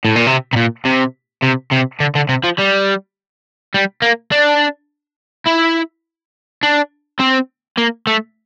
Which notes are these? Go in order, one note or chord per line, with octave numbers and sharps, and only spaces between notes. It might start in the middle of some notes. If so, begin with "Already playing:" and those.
A2
A#2
C3
C3
A#2
C3
C3
C3
D3
D3
C3
F3
G3
G3
A#3
D4
E4
D4
C4
A#3
A3